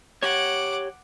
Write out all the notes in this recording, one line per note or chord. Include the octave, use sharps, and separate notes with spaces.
G4 C#5 F#5 D6